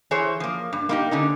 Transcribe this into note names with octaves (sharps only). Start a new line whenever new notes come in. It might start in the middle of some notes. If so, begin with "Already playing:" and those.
E3 G#4 C5 C#5
F3 A#3
G2
A#3 D#4 G4
D3 C#4 D#4